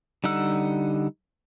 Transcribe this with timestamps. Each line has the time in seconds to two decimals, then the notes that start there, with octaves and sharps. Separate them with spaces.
0.24 D3 G3 D#4 F#5 E6